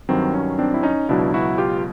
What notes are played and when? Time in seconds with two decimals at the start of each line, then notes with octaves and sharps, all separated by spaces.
0.09 G2 D#3 F#3 C4
0.34 C#4
0.59 C4 D4
0.74 E4
0.83 C#4 D#4
1.09 C#2 B2 F#3 D4 E4
1.34 E4 F#4
1.58 F4 G4